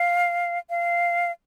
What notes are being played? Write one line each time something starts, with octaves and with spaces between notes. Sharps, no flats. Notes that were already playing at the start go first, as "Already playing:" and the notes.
Already playing: F5
F5